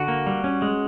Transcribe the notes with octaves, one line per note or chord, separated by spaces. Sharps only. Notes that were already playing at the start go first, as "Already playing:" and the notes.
Already playing: D3 F#4
A#3
G3
C#4
G#3